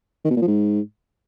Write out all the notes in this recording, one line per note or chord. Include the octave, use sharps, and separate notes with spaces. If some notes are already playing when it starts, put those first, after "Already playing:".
D#3
B2
A#2
F3
G#2